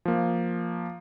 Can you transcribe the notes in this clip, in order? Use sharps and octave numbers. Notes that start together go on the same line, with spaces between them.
F3 A#3